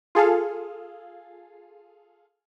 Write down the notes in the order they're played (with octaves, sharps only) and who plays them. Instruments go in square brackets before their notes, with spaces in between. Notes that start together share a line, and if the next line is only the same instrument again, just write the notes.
[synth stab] F4 G#4 A4 F5